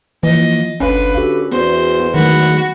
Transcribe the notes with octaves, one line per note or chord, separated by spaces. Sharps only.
E3 F3 A#3 D#5
G1 C#2 D3 C#4 B4 F5
F#4 G4 A4
E2 B3 F#4 C5
D#3 F#3 G#3 A3 F#4 B5